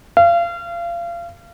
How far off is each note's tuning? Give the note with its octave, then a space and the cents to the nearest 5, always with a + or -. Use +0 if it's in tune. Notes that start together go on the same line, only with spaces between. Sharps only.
F5 -30